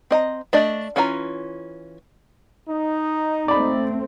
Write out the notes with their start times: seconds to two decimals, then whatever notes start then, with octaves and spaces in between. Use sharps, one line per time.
0.11 C4 D#5 A#5
0.53 A3 D4 D5 D#5
0.96 E3 C#4 F4 G#5 A#5
2.69 D#4
3.48 A3 C4 D5 B5